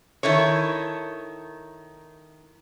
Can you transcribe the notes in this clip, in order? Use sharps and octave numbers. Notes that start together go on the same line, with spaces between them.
D#3 E4 A4 C#5